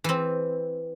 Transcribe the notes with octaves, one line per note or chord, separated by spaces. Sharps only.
E3 C4